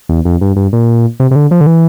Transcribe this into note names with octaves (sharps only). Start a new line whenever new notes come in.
E2
F2
G2
G2
A#2
C3
C3
D3
F3
D3
E3